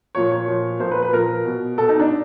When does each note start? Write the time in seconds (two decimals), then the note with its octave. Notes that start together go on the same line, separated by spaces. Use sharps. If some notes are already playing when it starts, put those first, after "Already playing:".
0.15 A#2 F3 C#5
0.32 C#5
0.48 A#2 F3
0.80 A#2 F3 C5
0.91 B4
1.02 B4
1.12 A#2 F3 A#4
1.45 B2
1.78 B2 A4
1.89 D#4
1.99 D4